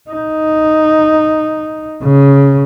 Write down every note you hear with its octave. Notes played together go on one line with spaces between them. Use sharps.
D#4
C#3